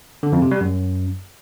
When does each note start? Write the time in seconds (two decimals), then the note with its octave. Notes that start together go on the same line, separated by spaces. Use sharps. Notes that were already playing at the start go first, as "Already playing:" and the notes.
0.23 D3
0.32 F2
0.42 C3
0.51 G3
0.61 F#2